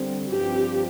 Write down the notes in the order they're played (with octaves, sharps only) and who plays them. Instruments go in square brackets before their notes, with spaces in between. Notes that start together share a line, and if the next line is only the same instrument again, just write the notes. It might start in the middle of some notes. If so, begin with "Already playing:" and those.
Already playing: [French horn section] D3 G3 C4
[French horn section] G2 F3 C4 [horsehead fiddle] G4